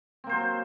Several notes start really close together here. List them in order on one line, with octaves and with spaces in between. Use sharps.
C4 A#3 C5 F#3